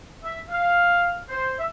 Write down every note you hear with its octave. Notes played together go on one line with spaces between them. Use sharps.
E5
F5
C5
E5